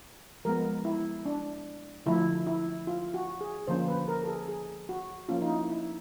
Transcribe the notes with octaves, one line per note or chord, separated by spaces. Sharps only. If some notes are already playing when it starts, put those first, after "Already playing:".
F3 G#3 B3 A#4
E4
D4
D3 F3 A3 E4
E4
F4
F#4
G#4
D3 F3 A#3 C#4 C5
B4
A#4
A4
G#4
G#4
F#4
F3 A#3 C#4 F4
D#4
E4
E4